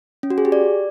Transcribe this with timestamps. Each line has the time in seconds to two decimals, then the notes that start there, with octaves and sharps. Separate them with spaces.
0.23 C#4
0.30 F#4
0.38 G#4
0.45 G4
0.52 D5